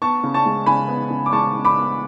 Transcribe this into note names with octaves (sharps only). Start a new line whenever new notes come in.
B3 A5 C#6
C#3
A5 C#6
G#3
C#3 G#5 B5
B3
C#3
D6
G#3 A5 C#6
C#3
B5 D6
B3